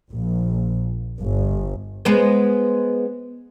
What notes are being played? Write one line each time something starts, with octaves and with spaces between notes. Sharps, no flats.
A#1
G1
G#3 B3 C5